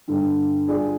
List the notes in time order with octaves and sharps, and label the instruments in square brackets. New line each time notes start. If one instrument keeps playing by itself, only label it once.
[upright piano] G2 D3 G3
G3 D4 F4 G#4 D5